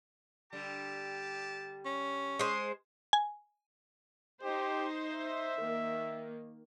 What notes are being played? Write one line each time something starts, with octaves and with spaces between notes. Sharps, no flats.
D3 G3 G4 A5
C#4
G#3 C5 C6 D#6
G#5
D#4 G4 C5
E5
D#3 A#3